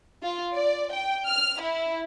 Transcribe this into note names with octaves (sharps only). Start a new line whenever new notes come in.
F4
D5
G5
F6
E4